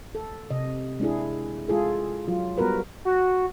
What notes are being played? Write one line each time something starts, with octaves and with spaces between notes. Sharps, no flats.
A4
C3 D#5
G#3 D4 E4 G#4
G#3 F4 G#4 A4
F#3 F4
G3 B3 F#4 A#4 B4
F#4